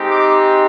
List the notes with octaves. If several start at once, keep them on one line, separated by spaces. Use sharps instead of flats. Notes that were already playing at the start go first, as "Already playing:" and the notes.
Already playing: G#3 C4 D#4 G4
D6